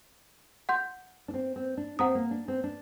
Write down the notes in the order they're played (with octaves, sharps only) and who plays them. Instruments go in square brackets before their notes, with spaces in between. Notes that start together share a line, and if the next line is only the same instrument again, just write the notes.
[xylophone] F#5 C6 G6
[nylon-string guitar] D4
C4
C4
D4
[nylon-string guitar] C4 [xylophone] F#5 A#5 D#6
[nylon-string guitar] A#3
D4
C4
D4